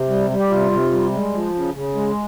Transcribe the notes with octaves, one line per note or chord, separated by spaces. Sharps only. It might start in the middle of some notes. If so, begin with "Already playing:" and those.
Already playing: C3
G3
G3
G4
C3 F4
C3
G3
G#3
F3
C#3
C#3
G#3